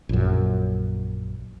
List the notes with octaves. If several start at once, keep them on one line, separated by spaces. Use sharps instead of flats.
A#1 F#2